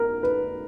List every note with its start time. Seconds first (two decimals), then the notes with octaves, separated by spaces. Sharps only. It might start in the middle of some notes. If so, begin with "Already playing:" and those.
Already playing: A#4
0.23 B4